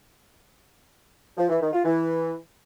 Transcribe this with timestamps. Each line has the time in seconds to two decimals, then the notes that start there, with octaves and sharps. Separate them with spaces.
1.38 F3
1.50 E3
1.61 D#3
1.73 F4
1.85 E3